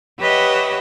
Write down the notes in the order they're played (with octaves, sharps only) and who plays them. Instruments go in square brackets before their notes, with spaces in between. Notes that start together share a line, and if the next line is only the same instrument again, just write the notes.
[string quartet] G4 B4 C#5 D#5 E5 F#5